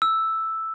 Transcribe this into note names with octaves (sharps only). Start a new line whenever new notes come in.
E6